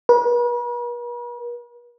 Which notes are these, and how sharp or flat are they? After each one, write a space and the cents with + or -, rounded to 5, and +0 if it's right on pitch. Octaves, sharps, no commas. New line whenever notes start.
B4 -45